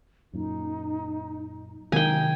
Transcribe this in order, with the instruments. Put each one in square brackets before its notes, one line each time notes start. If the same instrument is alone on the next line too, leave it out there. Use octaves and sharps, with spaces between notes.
[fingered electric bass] F#2 A#2 [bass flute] D#4
[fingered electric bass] C3 F#3 G#3 [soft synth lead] D#3 [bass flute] D#4 [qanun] G5 G#5